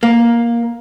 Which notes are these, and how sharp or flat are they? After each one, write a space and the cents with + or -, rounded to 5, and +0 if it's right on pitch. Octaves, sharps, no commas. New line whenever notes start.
A#3 +10